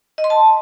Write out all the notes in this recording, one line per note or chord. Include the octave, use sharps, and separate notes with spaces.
D#5
C6
A5